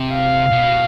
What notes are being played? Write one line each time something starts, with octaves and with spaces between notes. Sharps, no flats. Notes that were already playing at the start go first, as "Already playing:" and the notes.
Already playing: C3
F5
B2